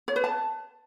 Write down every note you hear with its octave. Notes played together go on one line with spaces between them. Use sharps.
C#5
B4
A5